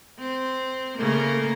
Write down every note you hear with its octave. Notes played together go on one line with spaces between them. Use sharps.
C4
C#3 A3 A#3